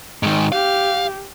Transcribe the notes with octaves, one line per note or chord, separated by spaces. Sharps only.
G#2 D#3
G4 F5